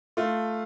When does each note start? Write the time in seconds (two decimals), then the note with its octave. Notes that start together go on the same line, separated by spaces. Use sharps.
0.17 A3 F4